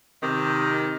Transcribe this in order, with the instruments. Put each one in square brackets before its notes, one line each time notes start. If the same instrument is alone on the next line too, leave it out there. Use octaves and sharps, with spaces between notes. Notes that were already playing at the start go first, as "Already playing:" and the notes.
[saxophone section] C3 D#3